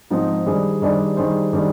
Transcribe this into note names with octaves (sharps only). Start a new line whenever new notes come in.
G#2 F3 C4 D#4
D#3 G3 D4 G#4 C5
D#3 G3 D4 G#4 C5
D#3 G3 D4 G#4 C5
D#3 G3 D4 G#4 C5